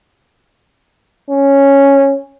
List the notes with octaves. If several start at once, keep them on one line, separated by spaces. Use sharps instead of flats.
C#4